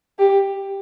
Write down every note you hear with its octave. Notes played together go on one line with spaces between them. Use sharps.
G4